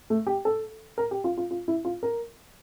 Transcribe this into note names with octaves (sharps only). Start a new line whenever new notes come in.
A3
G4
A4
A#4
G4
F4
F4
F4
E4
F4
A#4